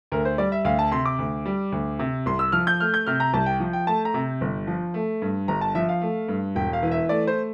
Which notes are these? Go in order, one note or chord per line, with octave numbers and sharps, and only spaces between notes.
D2 A#4
C5
G3 D5
E5
D2 F5
A5
C3 C6
D6
D2
G3
D2
C3
C2 C6
E6
F3 F6
G6
A3 F6
G6
C3 F6
A#5
C2 A5
G5
F3
G5
A3 A5
A#5
C3
G1
F3
A3
G2
G1 A#5
A5
F3 E5
F5
A3
G2
E1 G5
F5
E3
E5
A3 D5
C5